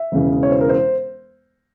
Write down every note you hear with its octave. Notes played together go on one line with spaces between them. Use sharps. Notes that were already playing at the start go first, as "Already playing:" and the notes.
Already playing: E5
E1 E2 C#3
C#5
C5
A#4
C5